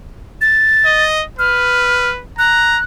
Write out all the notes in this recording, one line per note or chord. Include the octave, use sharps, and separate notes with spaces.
A6
D#5
B4 F6
A#5 F#6